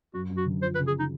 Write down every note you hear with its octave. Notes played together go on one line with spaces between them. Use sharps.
F#2 F#4
F#2
F#4
D3
F3 C5
B4
C#3
G#4
D#4